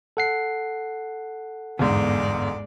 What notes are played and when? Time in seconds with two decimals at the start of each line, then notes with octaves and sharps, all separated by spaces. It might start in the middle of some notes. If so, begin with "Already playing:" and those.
0.17 A4 F#5 C7
1.79 G1 E2 G#2 G#3 D5